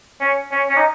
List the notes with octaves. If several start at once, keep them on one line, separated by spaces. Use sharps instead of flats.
C#4
C#4
C#4
D#4